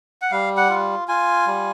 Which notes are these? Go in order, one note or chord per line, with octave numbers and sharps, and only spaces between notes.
F#5
G3 F5
F#5
F4
F4 G#5
G3